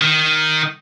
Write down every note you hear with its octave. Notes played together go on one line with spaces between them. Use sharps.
D#3